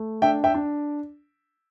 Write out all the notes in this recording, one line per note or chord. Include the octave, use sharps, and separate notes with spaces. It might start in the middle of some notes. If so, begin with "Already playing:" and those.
Already playing: A3
D4 E5 G5
E5 G5
D4